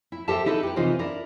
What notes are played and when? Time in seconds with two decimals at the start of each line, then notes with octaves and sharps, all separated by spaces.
0.12 E4
0.28 G4 A4 A#4 C5 E5 A5
0.46 D#4 E4 A4 B4
0.63 G4 B4
0.76 C3 E3 D#4 F4 A#4 C5
0.99 D4 E4 A#4